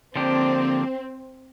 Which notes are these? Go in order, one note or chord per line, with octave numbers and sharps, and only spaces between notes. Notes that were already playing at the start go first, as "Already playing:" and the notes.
D3 F3 A#3 C4 D4 G4